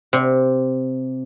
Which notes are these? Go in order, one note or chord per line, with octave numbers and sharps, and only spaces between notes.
C3